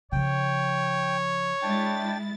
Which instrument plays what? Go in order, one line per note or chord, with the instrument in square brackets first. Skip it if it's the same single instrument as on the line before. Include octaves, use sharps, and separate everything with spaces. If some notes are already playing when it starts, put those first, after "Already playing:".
[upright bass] C#3 F3 [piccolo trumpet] C#5 [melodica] G5
[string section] G#3 E4 A6 [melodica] D4 G5